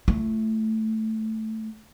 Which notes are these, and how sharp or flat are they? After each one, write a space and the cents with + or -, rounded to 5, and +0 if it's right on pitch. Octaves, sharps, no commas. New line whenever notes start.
A3 +0 E4 +45